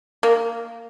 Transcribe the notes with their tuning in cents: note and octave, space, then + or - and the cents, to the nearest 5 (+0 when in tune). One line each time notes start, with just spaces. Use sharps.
A#3 -10